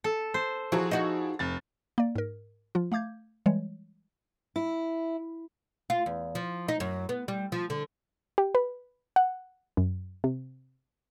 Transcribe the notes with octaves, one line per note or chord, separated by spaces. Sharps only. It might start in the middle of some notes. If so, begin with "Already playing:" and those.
A4
C5
F3 F#3 E4 G#4
D#4 F#4
F1 A6
A#3 D5
G#2 A#4
F3 F4
A3 F5 D6 G6 G#6
E3 G3 G#3 C#5
E4
F4
E2
F3
D#4
F#2
B3
G3
F3
D3
G4
B4
F#5
F#2
C3